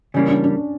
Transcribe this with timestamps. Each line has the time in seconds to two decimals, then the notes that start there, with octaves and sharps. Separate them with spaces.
0.14 C#3 E3 G3 A#3 C#4
0.28 D4
0.44 D4